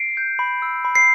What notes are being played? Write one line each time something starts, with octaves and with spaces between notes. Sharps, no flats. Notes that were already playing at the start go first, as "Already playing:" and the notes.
Already playing: C7 D7
G6
B5
E6
B5
C7